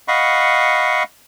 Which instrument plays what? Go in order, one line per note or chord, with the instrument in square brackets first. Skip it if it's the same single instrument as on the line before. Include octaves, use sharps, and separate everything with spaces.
[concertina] D#5 F5 F#5 B5 C#6